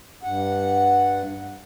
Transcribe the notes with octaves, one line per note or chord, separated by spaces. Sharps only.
G2 F#5